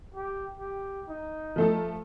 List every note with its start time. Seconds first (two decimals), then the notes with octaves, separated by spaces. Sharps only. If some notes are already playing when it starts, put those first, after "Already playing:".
0.14 G4
0.59 G4
1.08 D#4
1.56 F3 A3 A4